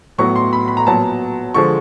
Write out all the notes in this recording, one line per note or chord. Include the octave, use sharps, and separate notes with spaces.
A2 F#3 B3 C#6
C6
B5
B5
A#5
A#2 F#3 B3 A5
D3 F3 G#3 C#6